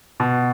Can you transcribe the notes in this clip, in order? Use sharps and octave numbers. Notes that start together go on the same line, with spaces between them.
B2